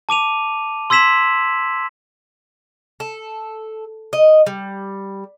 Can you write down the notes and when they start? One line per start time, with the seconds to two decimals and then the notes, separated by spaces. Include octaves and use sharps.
0.09 A5 D6 D#7 F7
0.90 C6 E6 G#6 B6 E7 F#7
3.00 A4
4.13 D#5
4.46 G3